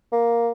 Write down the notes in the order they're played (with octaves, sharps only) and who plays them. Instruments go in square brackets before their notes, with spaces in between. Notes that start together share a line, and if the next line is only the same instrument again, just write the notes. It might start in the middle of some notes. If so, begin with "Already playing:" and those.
[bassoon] A#3